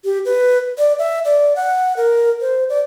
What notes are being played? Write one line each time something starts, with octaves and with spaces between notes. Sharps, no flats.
G4
B4
D5
E5
D5
F#5
A#4
C5
D5